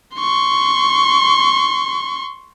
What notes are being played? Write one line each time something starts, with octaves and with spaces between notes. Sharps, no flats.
C6 C#6